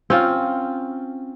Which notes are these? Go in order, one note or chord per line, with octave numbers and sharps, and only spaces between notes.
C4 C#4 F4